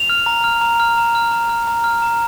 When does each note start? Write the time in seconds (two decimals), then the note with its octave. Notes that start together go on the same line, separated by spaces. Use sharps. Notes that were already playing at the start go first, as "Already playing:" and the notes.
Already playing: F7
0.09 F6
0.26 A#5
0.44 F6
0.61 A#5
0.80 F6
0.98 A#5
1.15 F6
1.32 A#5
1.49 F6
1.67 A#5
1.84 F6
2.02 A#5